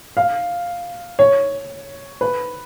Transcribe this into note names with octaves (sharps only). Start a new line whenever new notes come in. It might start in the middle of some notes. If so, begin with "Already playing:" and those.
F5
C#5
B4